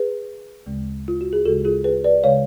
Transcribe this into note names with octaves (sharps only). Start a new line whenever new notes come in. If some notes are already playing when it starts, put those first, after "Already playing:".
Already playing: G#4 B4
D2 C#3 G#3
F4
F#4
G#4
D2 C#3 G#3 F#4 A4
F4 G#4
G#4 B4
B4 D5
C#3 G#3 C#5 F5